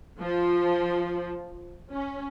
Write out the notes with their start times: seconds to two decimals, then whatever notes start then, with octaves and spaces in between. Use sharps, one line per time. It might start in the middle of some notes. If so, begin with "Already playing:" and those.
0.20 F3
1.92 C#4